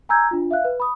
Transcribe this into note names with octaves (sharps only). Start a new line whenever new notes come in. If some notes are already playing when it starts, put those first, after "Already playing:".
G#5 A#5 E6 G6 G#6
D4 F4
E5 F5 F#6
B4
B5 D#6